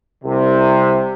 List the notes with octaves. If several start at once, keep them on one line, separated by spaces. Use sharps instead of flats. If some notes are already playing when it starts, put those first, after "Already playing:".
C2 C3